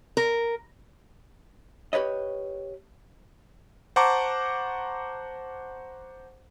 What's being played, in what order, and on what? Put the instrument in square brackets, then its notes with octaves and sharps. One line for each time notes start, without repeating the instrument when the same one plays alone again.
[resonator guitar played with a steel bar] A#4
[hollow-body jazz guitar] G4 B4 C#5 D#5
[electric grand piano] C5 F#5 A5 A#5 C#6 D6